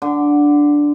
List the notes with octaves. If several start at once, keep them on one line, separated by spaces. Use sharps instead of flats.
D3